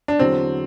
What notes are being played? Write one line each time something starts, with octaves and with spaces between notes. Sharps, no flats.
D4
E2 D3 F#3 C4